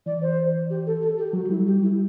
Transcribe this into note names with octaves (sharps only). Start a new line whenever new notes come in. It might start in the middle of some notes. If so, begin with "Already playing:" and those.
E3 D5
C5
G4
A4
A4
G4
F#3 F#4
G3 E4
G4
E4